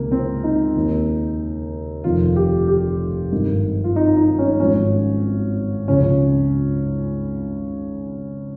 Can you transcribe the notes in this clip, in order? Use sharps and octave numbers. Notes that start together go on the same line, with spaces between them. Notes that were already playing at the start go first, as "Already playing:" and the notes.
Already playing: C#2 C3 D#3 A#3
C4
D#4
D#2 D#3
F1 F2 D#3 F4
G4
G4
G#1 G2 D#3
F4
D#4
D#4
C#4
G#1 G#2 F3 C#4
C#2 C#3 F3 C#4